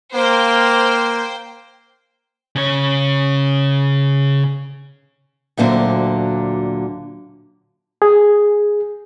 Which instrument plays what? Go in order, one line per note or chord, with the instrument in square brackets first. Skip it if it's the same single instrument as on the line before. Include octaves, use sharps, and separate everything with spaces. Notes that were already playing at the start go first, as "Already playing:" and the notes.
[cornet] A#3 [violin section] C5 G5
[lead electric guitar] C#3 C#5
[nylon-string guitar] D2 A#2 D3 F#3 C4
[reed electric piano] G#4